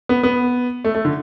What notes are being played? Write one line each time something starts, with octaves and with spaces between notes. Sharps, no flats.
B3
B3
A3
A3
D3